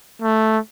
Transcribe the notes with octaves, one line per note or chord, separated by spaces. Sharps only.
A3